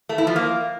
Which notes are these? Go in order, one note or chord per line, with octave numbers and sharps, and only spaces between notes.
A3
E4
F3
A#3